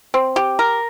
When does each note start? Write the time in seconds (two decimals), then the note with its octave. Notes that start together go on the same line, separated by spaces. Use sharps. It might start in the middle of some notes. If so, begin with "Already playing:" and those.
0.14 C4
0.36 G4
0.59 A#4